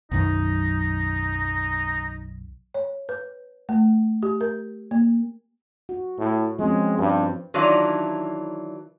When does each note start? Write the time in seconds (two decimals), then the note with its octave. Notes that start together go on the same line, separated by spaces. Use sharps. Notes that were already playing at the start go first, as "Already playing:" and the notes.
0.11 B1 F#2 D#3 D#4
2.74 C#5
3.09 B4
3.69 A3
4.23 G4
4.41 A#4
4.91 A#3
5.89 F#4
6.18 A2
6.59 F3 G#3 C4 C#4
6.98 G2 C5
7.54 D#3 E3 F#3 D4 E4 F4